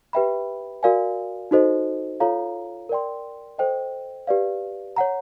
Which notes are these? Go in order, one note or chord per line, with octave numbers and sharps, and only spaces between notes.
G4 B4 E5 G5 B5
F#4 A#4 D5 F5 G#5
D#4 F#4 A4 C5 D#5
F4 A4 C#5 F5 A#5
A#4 D5 G5 C6
A4 C5 D#5 G5
G4 B4 D5 F5
C#5 F#5 A#5